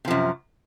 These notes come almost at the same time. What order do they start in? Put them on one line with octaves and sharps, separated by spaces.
C3 F3 F#2